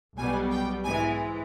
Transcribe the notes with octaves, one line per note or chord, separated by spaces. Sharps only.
B1 B2 G3 B3 G#5
G5
G#2 E3 G#3 B3 G#5